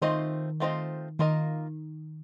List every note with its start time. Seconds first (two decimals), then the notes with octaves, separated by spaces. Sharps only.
0.02 D#3 A3 C4 F4 C5 D#5
0.60 A3 C4 F4 C5 D#5
1.19 D#3 A#3 F4 A#4 D#5